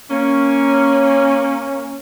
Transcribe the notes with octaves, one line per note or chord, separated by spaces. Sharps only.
A#3 C#4